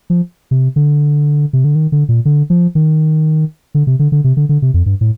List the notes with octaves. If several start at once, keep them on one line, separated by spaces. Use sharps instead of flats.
F3
C3
D3
C3
D3
D#3
D3
A#2
D3
F3
D#3
D3
C3
D3
D3
C3
D3
D3
C3
F2
G2
A2